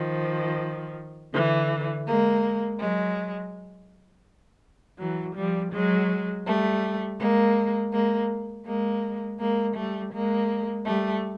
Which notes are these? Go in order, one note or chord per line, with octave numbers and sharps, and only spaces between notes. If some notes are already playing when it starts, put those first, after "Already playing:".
Already playing: D#3 F3
D3 E3
G#3 A#3
F#3 G#3
E3 F#3
F3 G3
F#3 G#3
G3 A3
G#3 A#3
G#3 A#3
G#3 A#3
G#3 A#3
G3 A3
G#3 A#3
G3 A3